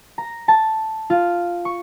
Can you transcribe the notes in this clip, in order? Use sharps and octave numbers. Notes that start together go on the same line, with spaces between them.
A#5
A5
F4
C#6